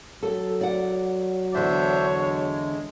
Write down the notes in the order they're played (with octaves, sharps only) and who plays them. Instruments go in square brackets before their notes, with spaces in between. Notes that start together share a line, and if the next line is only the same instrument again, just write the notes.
[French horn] F#3 [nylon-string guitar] A4
[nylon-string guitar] D5 F#5
[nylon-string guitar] E2 D3 [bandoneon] D4 C5 E5 [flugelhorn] C#5
[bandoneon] G#3